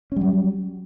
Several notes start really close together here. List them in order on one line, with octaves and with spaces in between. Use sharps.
C#4 G3 F#3